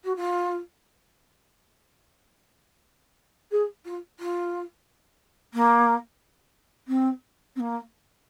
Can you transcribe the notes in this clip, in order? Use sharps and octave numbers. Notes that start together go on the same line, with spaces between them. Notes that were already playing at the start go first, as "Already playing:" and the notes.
F#4
F4
G#4
F4
F4
A#3
C4
C4
A#3